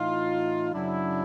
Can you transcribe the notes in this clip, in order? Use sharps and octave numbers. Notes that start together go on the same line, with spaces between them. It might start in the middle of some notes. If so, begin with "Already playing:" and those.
Already playing: A2 E3 D#4 F4
F#2 C#3 F#3 D4 E4